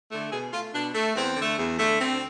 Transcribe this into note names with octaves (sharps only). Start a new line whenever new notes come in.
D3 A3
B2 G#4
A3 F4
B2 D4
A3
E2 C4
D3 A3
E2
D3 A3
D2 C4